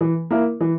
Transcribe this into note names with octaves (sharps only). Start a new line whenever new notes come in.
E3
A#3 E4 A#4
E3